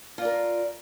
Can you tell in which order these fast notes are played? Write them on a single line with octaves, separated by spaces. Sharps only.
F4 D5 A#4